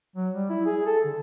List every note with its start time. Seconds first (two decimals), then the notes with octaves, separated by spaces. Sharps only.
0.16 F#3
0.34 G3
0.50 E4
0.66 G#4
0.86 A4
1.05 D3